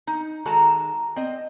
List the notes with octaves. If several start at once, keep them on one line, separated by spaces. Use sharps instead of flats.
D#4
D#3 G#3 F#4 A4 A5 A#5
C4 D#5